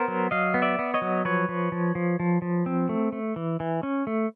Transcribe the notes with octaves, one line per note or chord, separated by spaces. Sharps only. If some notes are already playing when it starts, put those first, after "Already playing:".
Already playing: B3 A#4 C5
F#3
F#3 D#5 F5
B3
D5 E5
B3
C#5 D#5
F#3
F3 B4 C#5
F3
F3
F3
F3
F3
C4
A3
A3
E3
E3
C#4
A3